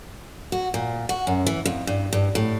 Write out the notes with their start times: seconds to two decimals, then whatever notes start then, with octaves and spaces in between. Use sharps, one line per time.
0.52 F#4
0.74 A#2
1.09 F#4
1.27 F#2
1.47 E3
1.66 F2
1.87 G2
2.13 G2
2.35 A2